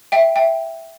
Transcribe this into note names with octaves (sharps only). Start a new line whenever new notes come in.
E5 G5
E5 G5